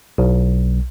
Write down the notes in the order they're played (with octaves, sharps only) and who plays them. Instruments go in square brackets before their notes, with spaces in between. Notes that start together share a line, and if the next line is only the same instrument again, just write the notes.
[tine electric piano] B1